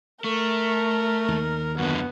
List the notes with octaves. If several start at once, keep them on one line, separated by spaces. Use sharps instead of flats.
A3 A#4
D#2 D#3
F#2 D3 B3